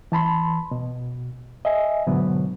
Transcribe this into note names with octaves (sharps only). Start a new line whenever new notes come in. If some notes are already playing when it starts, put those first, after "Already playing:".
E3 A5 B5 C6
B2
D#5 E5 G#5
G#2 B2 D3 F#3 B3